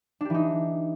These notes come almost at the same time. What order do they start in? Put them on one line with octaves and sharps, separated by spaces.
D4 G4 E3 D#4